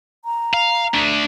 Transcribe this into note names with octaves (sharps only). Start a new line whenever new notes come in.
A#5
F5
A3 D4